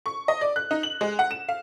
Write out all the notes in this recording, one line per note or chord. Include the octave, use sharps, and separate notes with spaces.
C#6
D#5
D5
F#6
D#4
F#7
G#3
F#5
E7
F5